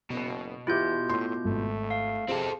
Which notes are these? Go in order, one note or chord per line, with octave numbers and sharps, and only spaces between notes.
F#1 B2
E2 E4 F4 G4 E5 D6 G6
A2 C6
G#1 A3
F5
C3 C4 G#4 A4